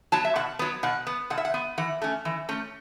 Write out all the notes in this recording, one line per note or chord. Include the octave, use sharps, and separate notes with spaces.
F#3 B3 A5
E5
B2 F#5
F#3 B3
B2 F#5
B3
B2 F#5
E5
F#5
B3
E3 F#5
A3 C#4
E3
A3 C#4